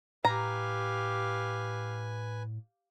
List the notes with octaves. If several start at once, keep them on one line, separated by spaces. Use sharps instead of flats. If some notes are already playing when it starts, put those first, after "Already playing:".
A2 G4 B4 F5 G#5 A#5